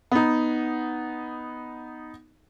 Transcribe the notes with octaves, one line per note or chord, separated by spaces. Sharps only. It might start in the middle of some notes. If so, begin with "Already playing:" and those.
B3 D#4